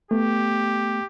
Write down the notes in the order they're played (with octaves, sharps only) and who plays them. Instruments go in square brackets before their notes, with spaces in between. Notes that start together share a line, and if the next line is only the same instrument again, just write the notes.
[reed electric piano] A3 B3 [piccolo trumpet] G4